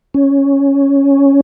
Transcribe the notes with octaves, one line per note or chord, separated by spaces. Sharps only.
C#4